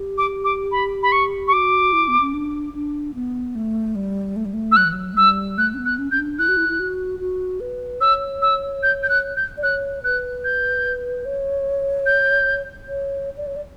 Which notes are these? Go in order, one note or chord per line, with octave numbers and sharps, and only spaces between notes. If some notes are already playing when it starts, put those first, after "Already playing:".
Already playing: G4
D6
D6
B5
B5
C#6
C#6
F#4 D6
E4
B3
C#4
D4
D4
B3
A3
G3
A3
G3
A3
E6
F#3 F#6
E3
F#3
A3
G3 E6
A3 F#6
C#4
B3
F#6
C#4
C#4 G6
D4
E4 F#6
F#4
E4
E4
F#4
F#4
B4
C#5 E6
E6
G6
G6
F#6
G6
D5
C#5 F#6
B4 F#6
G6
C#5
G6
C#5
D5
C#5
D5